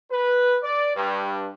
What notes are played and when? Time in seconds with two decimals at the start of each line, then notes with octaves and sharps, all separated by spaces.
0.11 B4
0.62 D5
0.95 G2